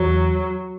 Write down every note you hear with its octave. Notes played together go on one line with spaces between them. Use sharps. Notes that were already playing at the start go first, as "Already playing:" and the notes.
Already playing: E2 F#3